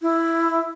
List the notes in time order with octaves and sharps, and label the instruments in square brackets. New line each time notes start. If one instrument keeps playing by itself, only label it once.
[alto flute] E4